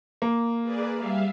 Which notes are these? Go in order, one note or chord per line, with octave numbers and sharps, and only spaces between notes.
A#3
G#4 B4 D5
G3 E5 F5